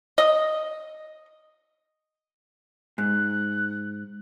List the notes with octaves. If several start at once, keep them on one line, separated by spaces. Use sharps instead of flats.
D#5
G#2 F#6